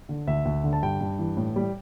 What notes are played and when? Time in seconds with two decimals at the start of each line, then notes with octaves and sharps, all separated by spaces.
0.09 D3
0.27 D2 E5
0.45 D2
0.64 D3
0.73 A5
0.83 G2 G5
1.01 G2
1.19 E3
1.37 A2
1.56 G3